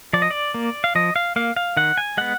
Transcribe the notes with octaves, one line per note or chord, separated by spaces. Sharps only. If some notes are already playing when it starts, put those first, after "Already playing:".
F3 D5
D#5
D5
A#3
F5
F3 D#5
F5
A#3 F5
F5
D#3 F#5
G#5
G#3 B3 F#5